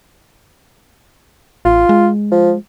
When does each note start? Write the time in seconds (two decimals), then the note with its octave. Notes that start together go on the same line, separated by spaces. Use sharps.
1.65 A1 F4
1.89 G#3
2.31 F3